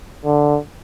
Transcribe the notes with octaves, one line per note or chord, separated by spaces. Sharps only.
D3